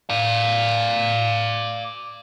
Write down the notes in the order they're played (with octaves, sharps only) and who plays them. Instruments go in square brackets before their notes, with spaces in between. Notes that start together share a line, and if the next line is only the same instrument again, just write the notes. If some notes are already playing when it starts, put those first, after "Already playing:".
[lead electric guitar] D5 F5